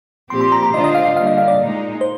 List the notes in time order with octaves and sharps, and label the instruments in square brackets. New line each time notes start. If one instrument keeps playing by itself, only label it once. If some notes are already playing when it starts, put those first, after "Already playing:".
[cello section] A#2 F3 C4 G4 [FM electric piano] C6
[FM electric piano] C6
A#5
A#5
[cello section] D3 G#3 D4 F4 C5 [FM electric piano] D#5
[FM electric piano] D#5
F5
F5
[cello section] D3 G3 A#3 [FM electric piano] F5
[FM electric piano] D#5
F5
D5
[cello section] A#2 G#3 D#4
[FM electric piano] C5